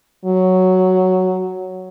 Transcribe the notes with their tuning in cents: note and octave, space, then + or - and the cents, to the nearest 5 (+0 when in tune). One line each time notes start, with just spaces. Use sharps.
F#3 +0